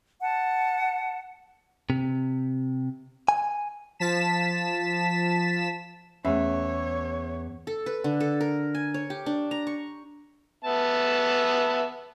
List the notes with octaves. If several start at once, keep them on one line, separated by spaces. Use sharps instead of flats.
F#5 A5
C3
G#5
F3 A5 B6 E7
E2 A3 C#4 C#5 E5
A4
B4
D3
A4
A#4
G#5
C#5
G4
D4
A#5
C#6
B3 E5 A5